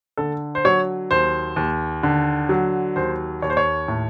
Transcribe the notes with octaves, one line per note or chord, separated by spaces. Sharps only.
D3 A4
C5
F#3 C#5
D#2 C5
D#2
D3
F#3
D#2 C5
D#2 C#5
C5
C#5
A2